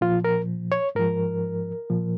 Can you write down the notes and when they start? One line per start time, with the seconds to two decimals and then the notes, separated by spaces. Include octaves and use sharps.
0.01 A#2 F3 F4
0.24 A#4
0.72 C#5
0.95 G#2 F3 A#4
1.90 A#2 F3